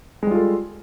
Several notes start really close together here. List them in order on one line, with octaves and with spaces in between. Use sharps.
G#3 G3 F4 A4